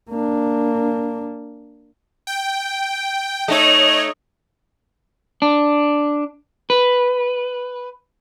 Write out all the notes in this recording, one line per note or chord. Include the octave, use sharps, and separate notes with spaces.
A#3 D4
G5
A3 D#4 C#5 D#5
D4
B4